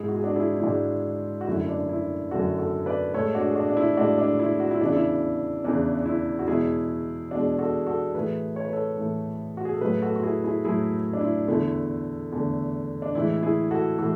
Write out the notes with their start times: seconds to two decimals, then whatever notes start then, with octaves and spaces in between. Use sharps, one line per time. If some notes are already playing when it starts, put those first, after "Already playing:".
Already playing: G#2 G#3 E4 G#4
0.08 F#4
0.16 G#4
0.23 D4 F#4
0.36 E4 G#4
0.56 E4
0.63 G#2 G#3 D4 F#4
1.41 F#4
1.47 F#2 D3 A3 E4
1.68 D4
1.89 E4
2.31 F#2 D3 A3 F#4 A4
2.59 F#4 A4
2.86 B4 D5
3.14 A2 G#3 A4 C#5
3.35 D4 F#4
3.48 G#4
3.55 D4 F#4
3.69 D4
3.77 E4
3.97 A2 G#3 D4 F#4
4.18 D4
4.39 E4
4.60 F#4
4.71 E4
4.81 E2 C#3 E3 D4
4.92 E4
5.64 E2 C#3 E3 D4
6.06 E4
6.39 F#4
6.48 E2 B2 G#3 E4 G#4
7.31 E2 B2 G#3 D4 F#4
7.59 F#4 A4
7.86 F#4 A4
8.15 A2 E3 A3 G#4 B4
8.56 C#5
8.65 B4
8.73 A4 C#5
8.98 A2 E3 A3
9.57 F#4
9.65 G#4
9.73 A4
9.81 A2 F#3 A3 G#4 B4
10.02 F#4 A4
10.16 F#4
10.23 E4 G#4
10.44 E4 G#4
10.65 A2 F#3 A3 E4 G#4
11.13 D4
11.21 E4
11.48 E2 D3 A3 E4
12.32 E2 D3 A3
13.02 D4
13.15 A2 E3 G#3 E4
13.42 E4 G#4
13.71 F#4 A4
13.99 A2 E3 G#3 F#4 A4